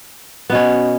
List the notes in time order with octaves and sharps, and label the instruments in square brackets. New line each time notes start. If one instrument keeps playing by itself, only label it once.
[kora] B3
B2
C#4